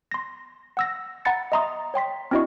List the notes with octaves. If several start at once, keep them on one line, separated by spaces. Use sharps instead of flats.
C6 A#6
F#5 E6 A#6
F#5 A#5 B5 A6 C#7
D#5 E5 A#5 C6 D#6
C#5 G5 C6 B6
C4 D4 E4 F#4 D#5 C#6